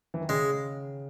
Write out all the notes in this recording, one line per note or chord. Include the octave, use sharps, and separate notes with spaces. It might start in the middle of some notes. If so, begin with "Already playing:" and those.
E3
D#3
C#3 G#3